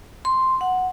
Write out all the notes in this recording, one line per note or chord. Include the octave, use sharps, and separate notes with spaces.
C6
F#5